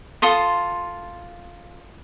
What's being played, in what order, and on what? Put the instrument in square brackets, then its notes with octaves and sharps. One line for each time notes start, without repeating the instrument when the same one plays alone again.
[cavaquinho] F4 A4 C6 D#6